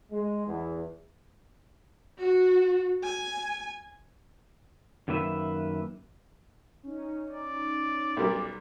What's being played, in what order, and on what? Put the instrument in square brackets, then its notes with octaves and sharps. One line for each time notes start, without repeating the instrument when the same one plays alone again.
[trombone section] G#3
E2
[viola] F#4
G#5
[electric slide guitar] F#2 D#3 A#3 B4 E5
[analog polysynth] C#4 D#4
[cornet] D5
[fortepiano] B1 G3 A#4